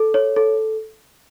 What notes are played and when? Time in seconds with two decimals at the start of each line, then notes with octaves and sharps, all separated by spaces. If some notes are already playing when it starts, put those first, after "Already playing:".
Already playing: A4
0.14 C#5
0.36 A4